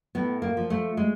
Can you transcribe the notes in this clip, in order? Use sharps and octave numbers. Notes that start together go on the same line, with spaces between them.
A2 B3
A#3
F3
A3
G#3